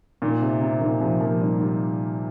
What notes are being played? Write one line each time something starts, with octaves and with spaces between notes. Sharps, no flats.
A#2 D#3
C3
C3
A#2 D#3
C3 F3
F3 A#3
D#3 G3
D#3 G3